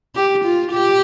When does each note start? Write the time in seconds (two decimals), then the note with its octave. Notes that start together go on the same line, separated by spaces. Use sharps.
0.16 G4
0.44 F4
0.72 G4